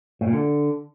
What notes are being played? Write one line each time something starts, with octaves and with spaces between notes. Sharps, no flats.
A2
A#2
D3